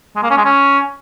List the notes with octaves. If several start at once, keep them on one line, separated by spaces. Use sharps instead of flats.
G#3
A#3
C#4
G#3
C#4